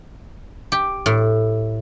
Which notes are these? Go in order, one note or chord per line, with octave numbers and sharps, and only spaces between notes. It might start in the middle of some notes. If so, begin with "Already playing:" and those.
G4
A2